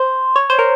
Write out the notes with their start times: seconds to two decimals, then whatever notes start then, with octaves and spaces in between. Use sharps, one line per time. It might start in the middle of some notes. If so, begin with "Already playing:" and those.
Already playing: C5
0.36 C#5
0.50 C5
0.59 A#4